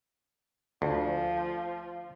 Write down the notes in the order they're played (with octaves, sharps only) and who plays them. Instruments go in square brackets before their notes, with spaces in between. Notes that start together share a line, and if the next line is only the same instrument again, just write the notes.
[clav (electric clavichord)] D2 [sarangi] F3